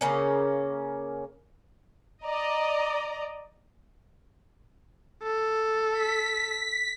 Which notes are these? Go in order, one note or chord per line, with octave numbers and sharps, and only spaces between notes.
C#3 A#3 C#4
D5 D#5 A#5
A4
B6